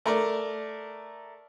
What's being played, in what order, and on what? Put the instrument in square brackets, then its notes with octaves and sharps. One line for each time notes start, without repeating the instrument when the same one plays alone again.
[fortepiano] A3 A#4 D5